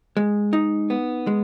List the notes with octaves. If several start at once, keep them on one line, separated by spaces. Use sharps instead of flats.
G#3
D#4
B3
G#3